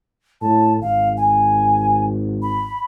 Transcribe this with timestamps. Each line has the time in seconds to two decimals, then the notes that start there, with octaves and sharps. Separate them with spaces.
0.41 A2 A5
0.82 G#1 F5
1.17 G#5
2.42 B5